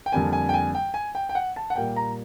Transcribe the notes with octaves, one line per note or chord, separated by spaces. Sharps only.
G5
F2 D3 G3 A#3 G#5
G#5
G5
G#5
G5
G#5
G5
G5
F#5
A5
F#5
A#2 G3 A#3 G5
A#5